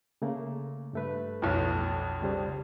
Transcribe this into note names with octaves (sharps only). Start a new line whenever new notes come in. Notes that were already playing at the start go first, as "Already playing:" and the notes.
C#3 A3 A#3
G2 A3 B4
B1 F2
C#3 G3 C5